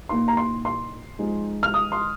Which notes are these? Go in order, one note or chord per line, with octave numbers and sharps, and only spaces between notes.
A#2 A#3 D#4 C6
A#5
C6
C6
F3 G#3 D#4
F6
D#6
C6